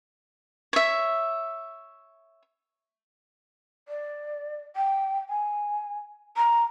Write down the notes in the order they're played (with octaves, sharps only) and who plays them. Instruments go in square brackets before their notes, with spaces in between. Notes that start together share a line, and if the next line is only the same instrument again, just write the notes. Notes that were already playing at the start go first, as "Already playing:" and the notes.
[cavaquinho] C#5 E5
[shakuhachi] D5
G5
G#5
A#5